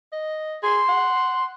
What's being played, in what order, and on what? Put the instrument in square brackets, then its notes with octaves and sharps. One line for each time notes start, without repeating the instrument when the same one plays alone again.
[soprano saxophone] D#5
[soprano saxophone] G#4 [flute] C6
[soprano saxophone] F#5